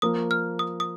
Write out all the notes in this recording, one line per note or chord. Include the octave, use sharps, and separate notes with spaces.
F3 A#3 F4 D#6
F6
D#6
D#6